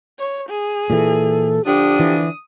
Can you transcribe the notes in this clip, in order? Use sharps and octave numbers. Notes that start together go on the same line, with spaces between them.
C#5
G#4
A#2 E3 A4
D3 F3 D4 G4 D#6
E3